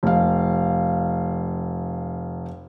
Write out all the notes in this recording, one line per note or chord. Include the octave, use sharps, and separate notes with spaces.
F1 F5